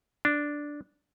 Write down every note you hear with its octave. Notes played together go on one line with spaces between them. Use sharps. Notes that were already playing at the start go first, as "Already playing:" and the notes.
D4